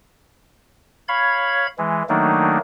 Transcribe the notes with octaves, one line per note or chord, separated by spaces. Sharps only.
C#5 F5 B5 G#6
E3 G#3
D#3 F#3 A3 A#3 D4 D#4